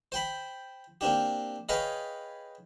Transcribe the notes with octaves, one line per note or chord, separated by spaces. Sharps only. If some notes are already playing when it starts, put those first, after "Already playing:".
C5 G5 B5
A#3 C4 D4 G4
G#4 B4 C#5 D#5 F5 G5